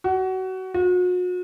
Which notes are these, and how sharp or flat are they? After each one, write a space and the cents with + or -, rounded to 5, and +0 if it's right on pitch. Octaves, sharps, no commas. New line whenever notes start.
F#4 +25
F#4 -40